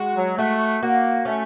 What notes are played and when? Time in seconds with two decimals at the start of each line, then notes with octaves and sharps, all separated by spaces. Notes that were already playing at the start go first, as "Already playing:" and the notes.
Already playing: G#3 F#4
0.16 F#3
0.38 A3 F#4
0.82 A#3 F#4
1.25 A3 C#4